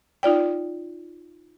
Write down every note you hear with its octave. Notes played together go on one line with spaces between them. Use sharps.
D#4 F4 D5 G5